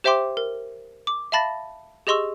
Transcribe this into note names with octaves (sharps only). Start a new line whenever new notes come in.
G4 C5 E5 G5 C6 D6
A#4
D6
E5 F5 A5 B5 A6 A#6
G4 G#4 D#5 C6 C#6 E6